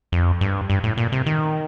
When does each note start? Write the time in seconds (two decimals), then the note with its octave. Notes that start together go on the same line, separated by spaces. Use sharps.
0.12 F2
0.41 G2
0.70 G2
0.84 A2
0.98 A#2
1.12 C3
1.26 D#3